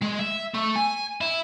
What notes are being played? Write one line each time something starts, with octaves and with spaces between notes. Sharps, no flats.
G#3
E5
A3
G#5
E4